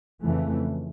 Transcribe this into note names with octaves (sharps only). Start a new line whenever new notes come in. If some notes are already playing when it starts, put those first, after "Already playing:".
F2 C#3 E3 A3